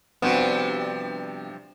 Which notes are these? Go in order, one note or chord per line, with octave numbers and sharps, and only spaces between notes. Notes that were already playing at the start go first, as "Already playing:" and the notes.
G2 C3 F3 B3 C4 F#4